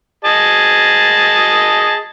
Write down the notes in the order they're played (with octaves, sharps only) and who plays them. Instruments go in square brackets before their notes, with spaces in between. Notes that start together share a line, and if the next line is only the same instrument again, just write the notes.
[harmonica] G#4 D#5 A5